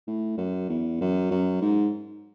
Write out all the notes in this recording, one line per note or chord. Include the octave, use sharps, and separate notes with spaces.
A2
F#2
E2
F#2
F#2
G#2